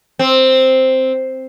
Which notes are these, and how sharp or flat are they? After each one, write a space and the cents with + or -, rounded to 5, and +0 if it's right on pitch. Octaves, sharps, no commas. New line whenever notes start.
C4 +0